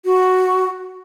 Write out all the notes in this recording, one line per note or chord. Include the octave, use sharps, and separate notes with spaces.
F#4